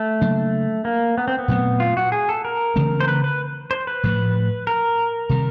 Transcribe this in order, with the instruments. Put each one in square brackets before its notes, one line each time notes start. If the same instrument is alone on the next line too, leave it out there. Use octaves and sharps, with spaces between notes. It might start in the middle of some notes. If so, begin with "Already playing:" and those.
Already playing: [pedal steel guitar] A3
[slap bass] C#3 F#3 A#3 D4
[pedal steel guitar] A#3
B3
C4
B3
[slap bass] A#2 F#3 A3 C4
[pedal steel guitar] F4
F#4
G#4
A4
A#4
[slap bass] C#3 E3 A3 C4
[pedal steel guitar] C5
B4
B4
C5
B4
[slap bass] A2 F3 A3
[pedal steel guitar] A#4
[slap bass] C3 D#3 G3